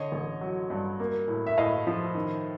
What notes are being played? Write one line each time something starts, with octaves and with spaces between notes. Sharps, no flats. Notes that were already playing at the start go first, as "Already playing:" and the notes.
Already playing: D3 C#5 D#5
A1
F#3
G2
A#3
A2
E5
A2 D#5 F5
F3
D#3